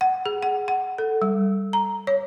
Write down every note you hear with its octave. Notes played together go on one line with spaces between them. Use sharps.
F#5
G#4
F#5
F#5
A4
G3
A#5
C#5